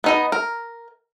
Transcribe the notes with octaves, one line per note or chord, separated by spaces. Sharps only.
B3 D#4 D#5
A#4